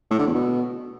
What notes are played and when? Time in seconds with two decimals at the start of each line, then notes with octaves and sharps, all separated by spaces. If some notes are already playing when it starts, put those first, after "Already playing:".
0.10 A2
0.18 D3
0.27 E2
0.35 B2